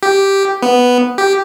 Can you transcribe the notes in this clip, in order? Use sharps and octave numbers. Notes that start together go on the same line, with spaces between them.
G4
B3
G4